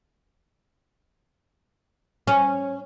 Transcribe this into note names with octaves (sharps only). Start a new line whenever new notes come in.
C#4